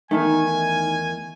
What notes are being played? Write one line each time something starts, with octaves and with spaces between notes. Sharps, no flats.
E2 D#3 A3 D#4 G#5